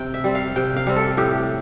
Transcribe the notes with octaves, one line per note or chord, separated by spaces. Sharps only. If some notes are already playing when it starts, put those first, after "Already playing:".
Already playing: C3 C4 G5
E5
G3 C4
F5
C3 G5
F5
G3 C4
A4
A2 G4